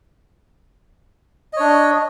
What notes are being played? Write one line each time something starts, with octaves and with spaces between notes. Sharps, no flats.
D4 C#5 D#5